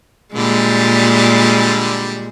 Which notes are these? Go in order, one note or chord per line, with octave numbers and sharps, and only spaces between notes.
A#2 D3 G3 G#3